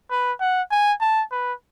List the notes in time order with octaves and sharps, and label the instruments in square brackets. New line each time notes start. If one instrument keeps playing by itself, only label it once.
[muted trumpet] B4
F#5
G#5
A5
B4